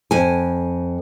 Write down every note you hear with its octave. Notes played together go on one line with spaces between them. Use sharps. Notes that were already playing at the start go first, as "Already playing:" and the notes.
F2 G#5